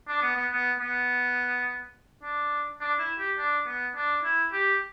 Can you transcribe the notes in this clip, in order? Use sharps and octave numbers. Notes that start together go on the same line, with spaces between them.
D4
B3
B3
B3
B3
D4
D4
E4
G4
D4
B3
D4
E4
G4